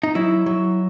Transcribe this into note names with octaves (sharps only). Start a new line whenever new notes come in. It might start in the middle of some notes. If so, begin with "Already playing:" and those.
D#4
F#3 E4
F#3